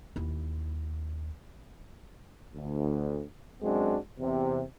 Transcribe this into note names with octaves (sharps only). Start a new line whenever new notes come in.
D#2 E4
D2
F#2 G#3 C4 D4 F#4
E2 C3